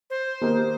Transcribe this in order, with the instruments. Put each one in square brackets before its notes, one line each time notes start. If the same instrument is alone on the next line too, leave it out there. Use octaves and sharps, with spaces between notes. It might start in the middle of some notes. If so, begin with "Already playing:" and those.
[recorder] C5
[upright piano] D#3 A#3 D#4 G4 A#4